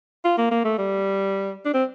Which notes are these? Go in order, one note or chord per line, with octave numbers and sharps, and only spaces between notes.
F4
A#3
A#3
A3
G3
D4
C4